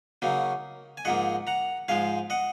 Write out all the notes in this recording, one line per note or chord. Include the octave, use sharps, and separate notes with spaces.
C#3 F#3 A#3 D#4
G#5
G#2 F3 A#3 D#5 F#5
F#5 A#5
G#2 F3 G#3 F5 G#5
D#5 F#5